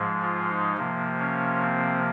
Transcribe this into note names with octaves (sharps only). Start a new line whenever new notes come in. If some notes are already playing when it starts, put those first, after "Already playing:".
Already playing: G#2 F3 G#3
F4
D#4
C3 F3 A#3
C#4
C4